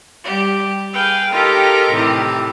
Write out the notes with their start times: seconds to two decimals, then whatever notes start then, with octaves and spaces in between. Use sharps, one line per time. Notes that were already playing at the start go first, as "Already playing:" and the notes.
0.23 G3 G4
0.92 G#4 B4 F5 G5
1.30 D#4 F4 G4 A4 A#4
1.90 A2 C3 D#3 E3 G4